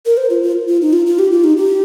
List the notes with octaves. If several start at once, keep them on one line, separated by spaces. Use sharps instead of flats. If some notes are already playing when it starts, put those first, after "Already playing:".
A#4
C5
F4
F4
F4
D#4
F4
F4
G4
F4
D#4
G4